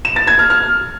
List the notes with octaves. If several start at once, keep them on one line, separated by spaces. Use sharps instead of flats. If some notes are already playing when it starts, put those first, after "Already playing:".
E7
A6
G#6
F6
F6